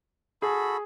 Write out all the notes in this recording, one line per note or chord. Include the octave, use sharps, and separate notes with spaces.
F#4 G#4 A4 B5